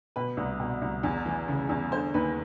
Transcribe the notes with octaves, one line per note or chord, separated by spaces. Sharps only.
B2 B4
C2
B2
C2
E2
E3
C#3
E2
D3 C5
D#2 B4